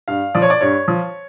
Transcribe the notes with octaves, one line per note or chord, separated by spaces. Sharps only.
G2 F5
F3 D5
C#5
D5
G2 C#5
F3